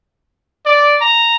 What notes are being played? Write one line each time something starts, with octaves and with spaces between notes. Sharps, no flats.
D5
A#5